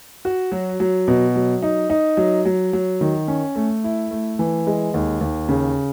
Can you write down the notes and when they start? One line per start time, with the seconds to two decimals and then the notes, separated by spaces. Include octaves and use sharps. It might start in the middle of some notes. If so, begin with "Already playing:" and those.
0.25 F#4
0.52 F#3
0.80 F#3
1.08 B2
1.36 F#3
1.62 D#4
1.90 D#4
2.17 F#3
2.45 F#3
2.73 F#3
3.01 D#3
3.28 C#4
3.56 A3
3.84 E4
4.11 A3
4.39 E3
4.67 G#3
4.94 D#2
5.21 D#2
5.49 C#3